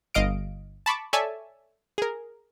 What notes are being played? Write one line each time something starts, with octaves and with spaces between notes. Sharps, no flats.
G1 D#5 F5 D7
A5 B5 C#6 D6
A4 C#5 D5 E5 G#5 A5
G#4 A#4